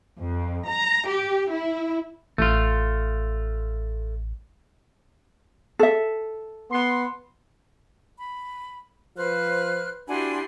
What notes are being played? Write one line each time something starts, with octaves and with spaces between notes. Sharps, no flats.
F2
A#5
G4
E4
A1 A3 F4
A4 E5
B3 C6
B5
F3 B4 C5 F6 F#6
D4 E4 F#4 G4 F#5 G#5 C6